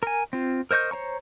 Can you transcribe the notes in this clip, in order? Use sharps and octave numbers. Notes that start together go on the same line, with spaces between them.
A#4 G#5
C4 F4
A#4 C5 D#5 C#6 G6
C5 C#5 A#5 C#6